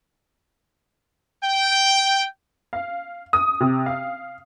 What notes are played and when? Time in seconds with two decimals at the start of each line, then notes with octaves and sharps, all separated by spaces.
1.44 G5
2.73 F5
3.33 D#6
3.60 C3
3.86 F5